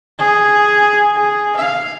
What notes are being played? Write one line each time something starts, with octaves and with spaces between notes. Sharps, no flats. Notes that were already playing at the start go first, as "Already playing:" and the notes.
G#4
G#4
F5